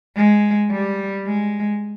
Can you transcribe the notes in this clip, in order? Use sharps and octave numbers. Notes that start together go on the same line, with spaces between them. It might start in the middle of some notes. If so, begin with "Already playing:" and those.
G#3
G3
G#3